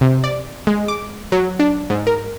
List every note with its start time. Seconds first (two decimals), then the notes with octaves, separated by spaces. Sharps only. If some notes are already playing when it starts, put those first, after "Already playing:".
0.01 C3
0.24 D5
0.67 G#3
0.88 D6
1.32 F#3
1.59 D4
1.90 G#2
2.07 A#4